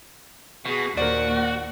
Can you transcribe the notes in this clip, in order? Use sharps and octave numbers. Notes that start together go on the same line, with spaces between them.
B2 F#4 G#4
D#2 A#2 F#4 A#4 C5 D5